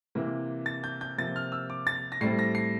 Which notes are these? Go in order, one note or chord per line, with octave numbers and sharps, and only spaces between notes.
C3 E3 A#3
A6
G6
G6
C3 F3 A#3 A6
F6
E6
D6
A6
A#6
A2 G3 C4 C7
A#6
C7